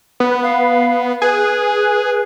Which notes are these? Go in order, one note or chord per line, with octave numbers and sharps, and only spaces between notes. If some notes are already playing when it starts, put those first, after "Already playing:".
B3
F5
G#4 B4